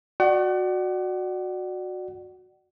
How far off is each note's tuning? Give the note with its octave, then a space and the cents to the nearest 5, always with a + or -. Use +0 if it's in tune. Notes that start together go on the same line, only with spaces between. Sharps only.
F#4 -15 D5 +20 F#5 +35